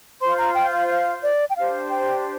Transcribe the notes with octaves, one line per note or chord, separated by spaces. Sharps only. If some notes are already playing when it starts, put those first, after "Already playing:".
F4 C5 C6
A#5
G5
F5
F5
D5
G5
D4 G4 C5 F5
G5